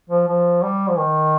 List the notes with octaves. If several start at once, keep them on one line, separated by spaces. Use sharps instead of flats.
F3
F3
G3
F3
D#3